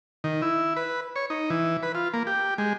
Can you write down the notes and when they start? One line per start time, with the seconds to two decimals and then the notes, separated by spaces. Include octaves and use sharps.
0.24 D#3
0.42 E4
0.77 B4
1.16 C#5
1.30 D#4
1.50 E3
1.83 B4
1.95 F4
2.14 A#3
2.27 G4
2.58 G#3